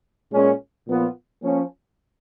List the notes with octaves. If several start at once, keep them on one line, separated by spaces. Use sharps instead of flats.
A#2 G#3 C#4
A#2 F3 B3 F4
F3 A#3 C#4